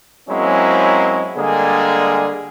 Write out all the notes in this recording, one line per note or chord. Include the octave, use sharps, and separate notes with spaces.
F#3 G#3 A#3 C4 C#4 E4
D3 G3 G#3 A#3 G#4